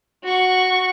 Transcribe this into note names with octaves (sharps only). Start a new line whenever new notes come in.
F#4 C#6